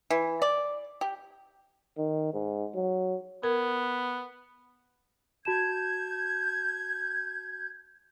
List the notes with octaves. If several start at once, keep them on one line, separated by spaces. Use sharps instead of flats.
E3
D5
G4
D#3
G#2
F#3
B3 A#4
F#4 A5 G6 G#6 E7